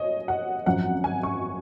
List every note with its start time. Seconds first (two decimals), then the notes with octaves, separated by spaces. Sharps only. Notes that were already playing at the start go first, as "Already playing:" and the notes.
Already playing: C#5 D#5
0.28 F#5
0.66 G#1 F#2 F3 C4 F#5
1.04 G#5
1.23 C#6